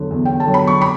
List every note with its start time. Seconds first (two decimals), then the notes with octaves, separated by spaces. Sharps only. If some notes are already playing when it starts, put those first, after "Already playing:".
Already playing: E2 D3 F#3
0.11 E2
0.25 G5
0.40 A5
0.46 D3 F#3
0.54 B5
0.67 C#6
0.81 B5 D6